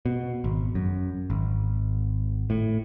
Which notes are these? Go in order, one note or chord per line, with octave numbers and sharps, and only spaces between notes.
B2
G#1
F#2
G#1
A2